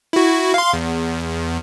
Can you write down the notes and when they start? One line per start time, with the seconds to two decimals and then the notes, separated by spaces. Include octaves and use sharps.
0.13 E4 F#4
0.54 F5 C6
0.73 E2